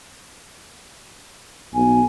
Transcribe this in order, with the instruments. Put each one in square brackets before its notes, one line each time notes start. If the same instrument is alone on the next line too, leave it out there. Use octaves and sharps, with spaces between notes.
[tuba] B1 [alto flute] G#5